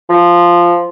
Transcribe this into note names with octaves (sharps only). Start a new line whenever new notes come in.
F3